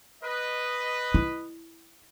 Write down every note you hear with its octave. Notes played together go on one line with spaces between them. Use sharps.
B4 D#5
E4